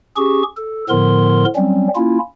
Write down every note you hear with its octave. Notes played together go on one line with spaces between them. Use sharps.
C#4 G4 G#4 C#6
A4
A2 D3 F3 B3 A#4 C6
F#3 G3 C4 C#4
A#3 C#4 E4 F4